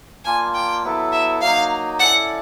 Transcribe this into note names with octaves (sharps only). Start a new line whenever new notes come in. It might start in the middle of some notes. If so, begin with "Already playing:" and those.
A#3 D4 F4 G#5
G5
F#3 B3 E4 A4
E5
F#3 A#3 D#4 F5
C#4 E4 A4 D5 F#5